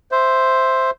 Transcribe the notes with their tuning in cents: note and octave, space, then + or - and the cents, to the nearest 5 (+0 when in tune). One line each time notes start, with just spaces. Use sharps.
C5 +0 E5 +0